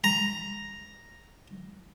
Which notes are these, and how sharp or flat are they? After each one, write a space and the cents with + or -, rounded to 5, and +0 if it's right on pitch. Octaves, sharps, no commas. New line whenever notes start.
A#5 +0